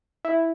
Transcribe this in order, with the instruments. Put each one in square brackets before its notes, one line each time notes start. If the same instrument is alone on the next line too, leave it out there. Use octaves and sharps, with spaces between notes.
[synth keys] E4